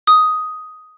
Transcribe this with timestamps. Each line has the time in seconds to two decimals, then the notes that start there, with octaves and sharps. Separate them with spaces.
0.07 D#6